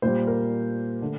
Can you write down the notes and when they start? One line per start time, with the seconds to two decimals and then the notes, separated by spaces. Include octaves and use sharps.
0.02 A#2 G3 C5
0.27 A#4
1.01 D3 A3